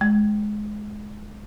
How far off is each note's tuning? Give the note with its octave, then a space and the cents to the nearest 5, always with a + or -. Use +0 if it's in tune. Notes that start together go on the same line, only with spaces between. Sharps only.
G#3 +15